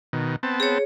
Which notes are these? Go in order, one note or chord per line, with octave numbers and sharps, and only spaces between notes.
B2 D#3
B3 C4 A5
G#4 C#5